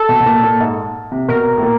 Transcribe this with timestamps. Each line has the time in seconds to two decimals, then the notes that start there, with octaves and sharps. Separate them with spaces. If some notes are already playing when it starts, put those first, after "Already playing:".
Already playing: A4
0.09 B2
0.20 B2
0.26 A#2
0.43 A#2
0.60 G#2
1.12 C3
1.28 B2 A#4
1.57 A2
1.63 A#2